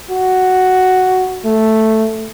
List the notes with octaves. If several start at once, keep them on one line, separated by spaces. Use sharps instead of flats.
F#4
A3